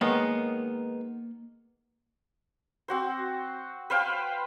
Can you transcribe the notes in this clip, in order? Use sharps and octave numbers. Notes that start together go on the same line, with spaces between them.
D#3 G#3 A#3 B3 C#5 D#5
C4 F#4 C5
B4 C5 F5 G5